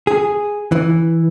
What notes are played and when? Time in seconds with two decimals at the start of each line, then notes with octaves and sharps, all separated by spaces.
0.07 G#4
0.72 E3